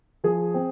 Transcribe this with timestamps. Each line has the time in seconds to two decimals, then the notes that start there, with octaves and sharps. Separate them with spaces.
0.24 F3 G#4
0.54 C4